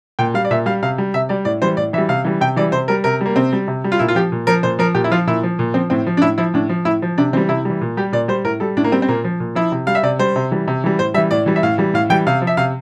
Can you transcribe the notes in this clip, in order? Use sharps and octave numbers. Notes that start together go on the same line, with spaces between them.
A#2 G5
G3 F5
D5
A#2 E5
G3 F5
C3 F5
G3
C3 E5
G3 D5
A2 D5
E3 G3 C5
A2 D5
E3 G3 E5
C3 F5
E3 G3
C3 G5
E3 G3 D5
C3 C5
G3 A#4
C3 A#4
G3 A#3
C3 C4
G3
C3
G3
F4
A#2 E4
F4
F3 G4
A#2
F3 A#4
A#2 C5
F3 A#4
A#2 G4
E4
F3 F4
A#2 E4
F3
A#2
F3 C4
A2 C4
F3
D4
A2 E4
F3 E4
A2 D4
F3
A2 E4
F3
C3 D4
E3 G3 C4
C3 E4
E3 G3
A#2
G3 G4
A#2 D5
G3 C5
A2 A#4
G3 A4
A2 D4
A#3
G3 C4
C4
A#2 A#3
F3
A#2
F3 E4
C3
G3 F5
E5
C3 D5
G3 C5
C3
E3 G3
C3
E3 G3
A2 C5
E3 G3 E5
A2 D5
E3 G3
E5
A2 F5
E3 G3
A2 F5
E3 G3 G5
C3 F5
F3
E5
C3 F5